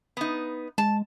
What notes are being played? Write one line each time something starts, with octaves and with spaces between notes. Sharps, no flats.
B3 D#4
G#3 A5